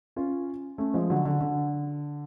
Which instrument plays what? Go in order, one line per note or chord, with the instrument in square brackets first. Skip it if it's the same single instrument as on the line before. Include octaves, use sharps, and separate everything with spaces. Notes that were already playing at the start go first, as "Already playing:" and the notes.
[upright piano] C#4 F4
A3 C#4
F3 G#3
D3 F#3
D3
D3